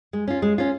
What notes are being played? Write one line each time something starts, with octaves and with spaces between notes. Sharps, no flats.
G#3
C#4 F4
G#3
C#4 F4